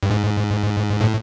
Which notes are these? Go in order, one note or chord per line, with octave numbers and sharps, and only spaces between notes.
G2
G#2
A2